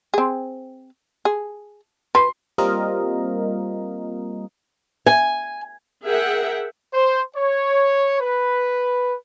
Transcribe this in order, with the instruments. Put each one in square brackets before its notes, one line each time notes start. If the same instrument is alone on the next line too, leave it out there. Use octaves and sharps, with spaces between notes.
[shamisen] C4 G#4
G#4
[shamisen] B4 [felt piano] C6
[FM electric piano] G3 A#3 C4 F4 A#4 D#5
[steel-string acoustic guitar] G#5
[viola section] G#4 A#4 E5 F#5 G5
[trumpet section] C5
C#5
B4